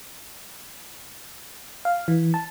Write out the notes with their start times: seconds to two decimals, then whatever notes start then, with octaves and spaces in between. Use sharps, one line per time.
1.85 F5
2.08 E3
2.34 A5